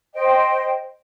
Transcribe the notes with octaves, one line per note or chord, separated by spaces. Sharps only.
C5 D#5 G5